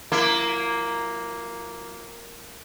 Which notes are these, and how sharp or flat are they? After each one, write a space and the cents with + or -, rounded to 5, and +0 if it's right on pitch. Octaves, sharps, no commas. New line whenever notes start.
F#3 -30 A#3 +0 E4 +30